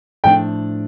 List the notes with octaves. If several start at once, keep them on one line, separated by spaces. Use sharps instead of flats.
A2 F3 A3 D4 G5